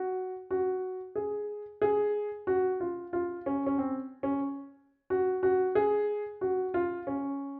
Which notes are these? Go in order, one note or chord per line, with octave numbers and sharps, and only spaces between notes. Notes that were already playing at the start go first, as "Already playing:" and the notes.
Already playing: F#4
F#4
G#4
G#4
F#4
F4
F4
C#4
C#4
C4
C#4
F#4
F#4
G#4
F#4
F4
C#4